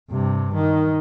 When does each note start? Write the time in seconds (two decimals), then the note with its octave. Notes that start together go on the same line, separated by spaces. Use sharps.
0.10 G2 C3
0.54 D#3